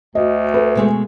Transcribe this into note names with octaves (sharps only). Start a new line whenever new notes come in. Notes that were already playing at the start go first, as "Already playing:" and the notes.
D2 F#4 D#5
A4 B4
B2 G#3 A3